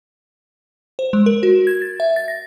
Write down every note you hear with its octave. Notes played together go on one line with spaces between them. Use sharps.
C5
G#3
A#4
F#4
G#6
A6
E5
A6
A#6